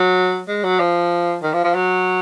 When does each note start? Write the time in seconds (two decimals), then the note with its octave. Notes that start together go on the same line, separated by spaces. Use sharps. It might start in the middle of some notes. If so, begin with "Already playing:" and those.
Already playing: F#3
0.48 G#3
0.63 F#3
0.79 F3
1.43 D#3
1.53 F3
1.64 F3
1.75 F#3